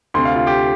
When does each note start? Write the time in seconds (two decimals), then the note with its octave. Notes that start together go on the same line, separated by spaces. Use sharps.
0.14 D2 C6
0.18 C3
0.25 F5
0.36 F4
0.47 G4